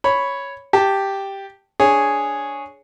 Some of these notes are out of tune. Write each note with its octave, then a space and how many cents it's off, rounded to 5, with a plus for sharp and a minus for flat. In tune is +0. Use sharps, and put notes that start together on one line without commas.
C#5 +0 B5 +0
G4 +0 A5 +0
D4 -5 G#4 +0 C#5 +0